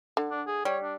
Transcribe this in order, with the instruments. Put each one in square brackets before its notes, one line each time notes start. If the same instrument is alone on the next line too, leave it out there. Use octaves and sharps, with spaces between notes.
[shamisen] D3
[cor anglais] D4
G#4
[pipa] G3 [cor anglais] C#5
[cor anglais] D4